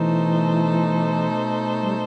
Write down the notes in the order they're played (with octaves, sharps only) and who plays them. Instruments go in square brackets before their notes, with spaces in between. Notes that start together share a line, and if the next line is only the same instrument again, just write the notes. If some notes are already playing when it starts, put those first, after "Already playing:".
Already playing: [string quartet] B2 A3 D#4 A4 C5 [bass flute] E3
[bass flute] G3